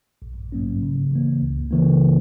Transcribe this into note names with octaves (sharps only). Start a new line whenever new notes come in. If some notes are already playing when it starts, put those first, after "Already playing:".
A#1
G#2 F#3 A#3 C#4
C#3
E3 A#3
C#2
C#3 E3 A#3